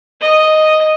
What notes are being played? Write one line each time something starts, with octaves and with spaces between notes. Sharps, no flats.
D#5